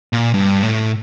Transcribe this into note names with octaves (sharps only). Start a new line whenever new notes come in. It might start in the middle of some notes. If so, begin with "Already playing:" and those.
A#2
G2
A2